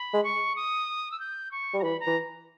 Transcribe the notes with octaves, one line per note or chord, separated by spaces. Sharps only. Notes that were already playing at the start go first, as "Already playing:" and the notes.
Already playing: B5
G#3
C#6
D#6
E6
G6
C#6
G3
A#5
E3 B5
A#5
E3